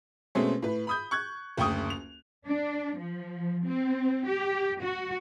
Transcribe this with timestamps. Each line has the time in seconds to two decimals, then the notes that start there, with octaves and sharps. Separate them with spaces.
0.35 B2 G#3 A3 C4 C#4
0.62 A2 B4
0.87 B5 D#6 G6
1.11 C#6 F#6 G#6
1.57 F#1 D2 G5 C#6 D#6
1.90 F7
2.46 D4
2.98 F3
3.65 C4
4.27 G4
4.82 F#4